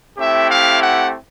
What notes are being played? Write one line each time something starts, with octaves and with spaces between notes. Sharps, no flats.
A3 C4 E4 G4 E5
F5
F#5